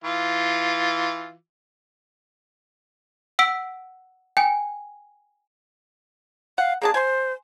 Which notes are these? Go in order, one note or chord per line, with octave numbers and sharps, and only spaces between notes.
E3 F4
F#5 E6 B6 D7
G5 G#5
F5 F#5
A#3 D4 G#4 A5
C5 G#5 C6